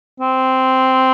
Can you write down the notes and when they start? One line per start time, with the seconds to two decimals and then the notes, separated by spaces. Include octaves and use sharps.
0.20 C4